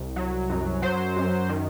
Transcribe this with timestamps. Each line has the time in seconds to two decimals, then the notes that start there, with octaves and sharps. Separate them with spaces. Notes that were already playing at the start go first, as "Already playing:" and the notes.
Already playing: C2
0.16 F#3
0.50 F#2
0.82 F#3 C5
1.16 F#2
1.49 D#3